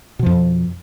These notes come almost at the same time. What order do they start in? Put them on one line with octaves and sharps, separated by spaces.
B2 F3 F2